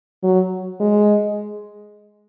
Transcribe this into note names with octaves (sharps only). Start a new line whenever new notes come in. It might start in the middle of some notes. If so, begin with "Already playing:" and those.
F#3
G#3